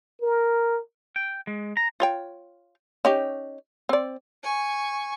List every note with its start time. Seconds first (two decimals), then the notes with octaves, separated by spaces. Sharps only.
0.21 A#4
1.16 G5
1.47 G#3
1.77 A#5
2.00 F4 C#5 G5
3.05 C#4 D#4 G4
3.89 C4 D5
4.44 G#5 C#6